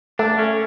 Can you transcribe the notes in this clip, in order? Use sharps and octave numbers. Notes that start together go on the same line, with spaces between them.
A3 D4
C#4